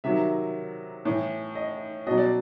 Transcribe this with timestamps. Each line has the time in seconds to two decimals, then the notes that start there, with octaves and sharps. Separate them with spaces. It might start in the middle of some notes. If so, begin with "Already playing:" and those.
0.04 C3 D#3 F#3 E5
1.05 A2 E3
1.55 D#5
2.07 B2 F#3 D#5
2.18 D5